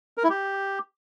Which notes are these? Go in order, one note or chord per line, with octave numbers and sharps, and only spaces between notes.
A#4
E4
G4